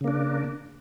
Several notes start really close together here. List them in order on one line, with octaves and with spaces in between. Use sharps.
C#3 A#3 D4